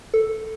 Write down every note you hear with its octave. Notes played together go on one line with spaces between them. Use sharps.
A4